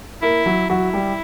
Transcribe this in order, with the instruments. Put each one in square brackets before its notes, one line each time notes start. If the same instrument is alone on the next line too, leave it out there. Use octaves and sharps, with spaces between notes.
[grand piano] A#3 A#4 [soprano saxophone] E4
[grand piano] F#3 F#4
[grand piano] F#3 F#4 [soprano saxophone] E4
[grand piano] G3 G4